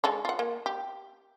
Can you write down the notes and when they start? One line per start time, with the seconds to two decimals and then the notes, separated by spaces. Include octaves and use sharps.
0.04 G#3 A4 C#5
0.25 F4 F#5
0.39 A#3
0.66 G4